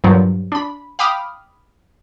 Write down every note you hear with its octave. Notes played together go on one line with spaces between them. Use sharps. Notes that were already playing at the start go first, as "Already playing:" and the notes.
G2 A#2 F3 F#3
D4 B5
F5 G5 B5 D6 D#6 F6